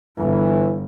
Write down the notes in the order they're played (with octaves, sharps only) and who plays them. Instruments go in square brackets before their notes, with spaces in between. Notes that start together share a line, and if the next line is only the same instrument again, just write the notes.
[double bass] G1 [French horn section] E3